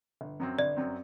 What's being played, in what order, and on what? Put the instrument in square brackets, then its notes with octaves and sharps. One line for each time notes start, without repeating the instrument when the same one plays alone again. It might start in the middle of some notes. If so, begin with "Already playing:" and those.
[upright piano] G1
F#2 F#3 C4
[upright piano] G1 [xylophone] D5
[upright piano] F#2 F#3 C4